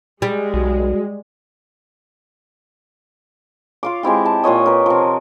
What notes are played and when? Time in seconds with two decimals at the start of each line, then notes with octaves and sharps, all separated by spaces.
0.22 G3 G#3
0.54 B1 F#4
3.83 F4 F5 D6
4.03 G#3 C4 E4 G4
4.26 A5
4.44 A#2 F4 C#5 D#5
4.66 A#4 B4
4.86 C3 F3